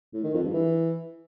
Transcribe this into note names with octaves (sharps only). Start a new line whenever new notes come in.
A2
D#3
F2
G2
E3